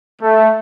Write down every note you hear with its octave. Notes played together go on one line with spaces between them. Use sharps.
A3